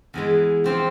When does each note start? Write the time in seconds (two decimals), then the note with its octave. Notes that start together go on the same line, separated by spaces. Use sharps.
0.14 E2 E3 G#3
0.64 F3 C4 G4